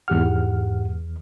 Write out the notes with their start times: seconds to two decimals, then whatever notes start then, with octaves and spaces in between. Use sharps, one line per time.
0.08 E2 G#2 G4 F#5 F6